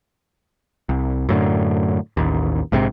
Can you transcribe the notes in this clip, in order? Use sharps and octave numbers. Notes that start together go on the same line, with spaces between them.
C2
F#2 A2 D3
A1 D#2
A#1 G#2 C3